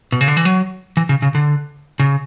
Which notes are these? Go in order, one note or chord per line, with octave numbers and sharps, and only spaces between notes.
B2
C#3
D3
E3
F#3
E3
C#3
C#3
D3
C#3